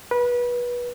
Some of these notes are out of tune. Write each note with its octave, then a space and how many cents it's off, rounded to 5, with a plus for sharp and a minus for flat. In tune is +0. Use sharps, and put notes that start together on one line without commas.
B4 -25